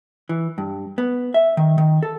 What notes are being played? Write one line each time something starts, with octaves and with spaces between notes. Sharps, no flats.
E3
G2
B3
E5
D#3
D#3
A4